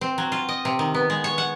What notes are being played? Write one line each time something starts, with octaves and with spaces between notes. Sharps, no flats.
C4
F#3
F4
D#5
C3
D#3
B3
G#3
C#5
F#5